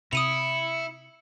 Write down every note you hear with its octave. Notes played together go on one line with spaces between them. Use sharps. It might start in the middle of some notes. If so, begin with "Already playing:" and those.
C3 E4 D#6 C#7 D#7 F7